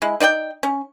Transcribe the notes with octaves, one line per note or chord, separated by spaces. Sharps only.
G#3 E4
D#4 D5 F#5 G5
C#4